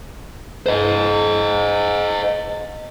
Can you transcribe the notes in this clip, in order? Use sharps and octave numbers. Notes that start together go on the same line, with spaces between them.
C5 D#5